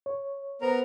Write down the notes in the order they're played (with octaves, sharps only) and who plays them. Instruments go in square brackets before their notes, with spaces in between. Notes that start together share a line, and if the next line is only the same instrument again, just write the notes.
[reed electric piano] C#5
[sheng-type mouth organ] B3 A#4 A#5 [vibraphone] C5